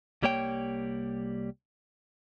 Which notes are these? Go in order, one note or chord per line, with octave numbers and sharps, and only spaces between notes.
C2 G3 A#3 C#5 G5